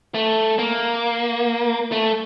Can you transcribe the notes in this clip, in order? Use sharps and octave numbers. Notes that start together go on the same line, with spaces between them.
A3
A#3
A3